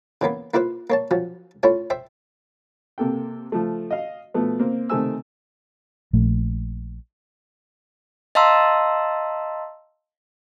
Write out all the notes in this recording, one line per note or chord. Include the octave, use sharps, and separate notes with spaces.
C#3 E3 A#3 B3
A#3 E4 F4 B4 C5
A#3 C#5 A5
F3 F#3 C#4
A3 C#4 E4 F4 C#5
C5 E5 G5
C3 A#3 A4 G5
F3 A3
D#5 F5
B2 F3 A3 B3
A#3 C4
C3 D#3 A3 C4 G#5 E6
A#1 A3
D#5 F5 A5 A#5 C6 E6